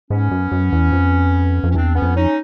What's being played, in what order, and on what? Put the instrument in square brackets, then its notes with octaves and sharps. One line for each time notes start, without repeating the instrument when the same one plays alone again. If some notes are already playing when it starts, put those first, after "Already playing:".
[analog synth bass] G#2 [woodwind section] B3 C#4
[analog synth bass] F#2
F#2
E2
F2
F2
[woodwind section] C#4
[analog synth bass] E2 [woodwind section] C4 D4
[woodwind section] B3 C#4
[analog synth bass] F2
[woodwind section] C#4 D#4